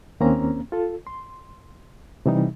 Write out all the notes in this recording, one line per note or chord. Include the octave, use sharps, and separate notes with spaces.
D#2 A#3 C4 C#4 A#5
F4 A4
C6
C3 E3 G3 D#4